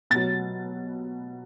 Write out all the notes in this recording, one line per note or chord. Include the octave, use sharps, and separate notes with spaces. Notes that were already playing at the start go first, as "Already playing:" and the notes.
B2 F#3 A6